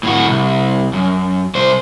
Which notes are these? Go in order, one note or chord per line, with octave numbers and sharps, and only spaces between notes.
A2 F#4
C2
F#2
C2 C5